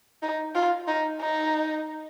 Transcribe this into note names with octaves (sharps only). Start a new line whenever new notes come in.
D#4
F4
D#4
D#4